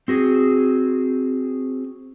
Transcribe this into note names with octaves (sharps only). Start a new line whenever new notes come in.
C4 F#4 G#4